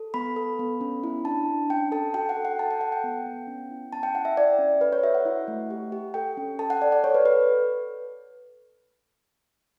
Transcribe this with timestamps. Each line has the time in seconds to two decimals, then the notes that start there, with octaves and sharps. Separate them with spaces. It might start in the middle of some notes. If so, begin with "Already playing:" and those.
Already playing: A4
0.14 B3 B5
0.36 A4
0.59 B3
0.81 C#4
1.03 E4
1.25 D4 A5
1.48 D4
1.70 C#4 G5
1.92 A4 A5
2.14 F#4 G5
2.29 F#5
2.37 A4
2.45 F#5
2.59 A4 A5
2.71 G5
2.81 A4 F#5
2.92 G5
3.04 B3
3.26 B3
3.47 C#4
3.71 E4
3.93 C#4 A5
4.03 G5
4.15 E4 F#5
4.25 E5
4.37 E4 D5
4.59 C#4
4.81 A4 B4
4.93 C#5
5.03 F#4 E5
5.15 F#5
5.25 E4
5.48 A3
5.70 G4
5.92 G4
6.14 A4 G5
6.37 C#4
6.59 A4 A5
6.70 F#5
6.82 A4 D5
6.92 D5
7.04 A4 C#5
7.15 B4
7.25 A4 B4